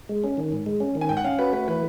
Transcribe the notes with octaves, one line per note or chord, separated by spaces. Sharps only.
G#3
C#4
D#3
G#2
G#3
C#4
D#3
G#5
G#2 G5
F#5
C#4 F5
F#4 B4
A3 B4
E3 B4